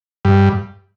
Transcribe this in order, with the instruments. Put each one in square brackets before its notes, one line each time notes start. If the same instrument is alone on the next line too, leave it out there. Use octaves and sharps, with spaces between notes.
[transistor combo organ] G2